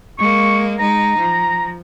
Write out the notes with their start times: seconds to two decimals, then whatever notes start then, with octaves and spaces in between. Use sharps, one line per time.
0.19 G#3 A#3 C#6
0.80 G#3 D#4 A#5
1.19 F3